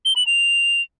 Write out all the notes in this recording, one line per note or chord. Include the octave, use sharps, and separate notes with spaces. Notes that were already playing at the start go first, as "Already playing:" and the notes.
G7
F#7
F7